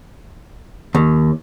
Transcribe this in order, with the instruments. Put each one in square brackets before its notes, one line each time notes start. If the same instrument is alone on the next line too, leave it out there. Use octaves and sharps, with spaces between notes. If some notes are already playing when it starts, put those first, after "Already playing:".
[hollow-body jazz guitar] D#2